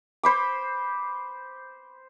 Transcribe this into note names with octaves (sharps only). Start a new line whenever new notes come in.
C5 B5 D6